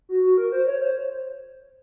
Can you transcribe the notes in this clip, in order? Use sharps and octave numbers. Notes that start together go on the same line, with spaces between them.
F#4
F#4
A#4
C5
C#5
C5